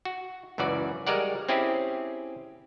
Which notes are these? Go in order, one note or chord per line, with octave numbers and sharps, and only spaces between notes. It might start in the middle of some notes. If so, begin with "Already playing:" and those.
F#4
C#2 F#2 E3 F#4 D5
G3 G#3 F#4 A#4 D5 F#5
C4 C#4 E4 G4 G#4